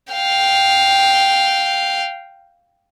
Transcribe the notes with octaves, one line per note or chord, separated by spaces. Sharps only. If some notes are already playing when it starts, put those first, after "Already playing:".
F5 G5